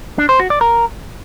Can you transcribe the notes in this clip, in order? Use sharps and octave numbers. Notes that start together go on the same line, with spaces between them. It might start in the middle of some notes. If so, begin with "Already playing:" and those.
D4
C5
F#4
D5
A#4